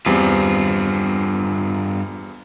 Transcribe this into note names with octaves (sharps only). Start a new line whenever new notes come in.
E2 G2 G3 C4 F4